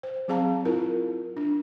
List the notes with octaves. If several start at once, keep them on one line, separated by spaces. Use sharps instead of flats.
C5
F#3 C4 G#4 F5 A5 A#5
E4 F4 A#4
D4